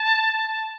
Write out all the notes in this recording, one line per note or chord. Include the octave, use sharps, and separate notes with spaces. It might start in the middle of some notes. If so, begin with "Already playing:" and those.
Already playing: A5